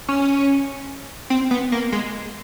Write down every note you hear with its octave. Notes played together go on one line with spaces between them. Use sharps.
C#4
C4
B3
A#3
G#3